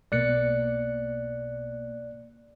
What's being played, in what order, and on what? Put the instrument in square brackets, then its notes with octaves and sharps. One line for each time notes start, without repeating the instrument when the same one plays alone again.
[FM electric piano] B1 B2 A#3 [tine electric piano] D5 F#6 C#7